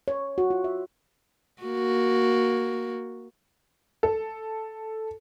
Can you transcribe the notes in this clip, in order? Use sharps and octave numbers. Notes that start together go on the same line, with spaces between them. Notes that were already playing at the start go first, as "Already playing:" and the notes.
C#5
F#4
F4
E5
A#3 F#4
A4